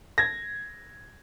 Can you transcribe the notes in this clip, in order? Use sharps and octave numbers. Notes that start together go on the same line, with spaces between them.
G#6 A#6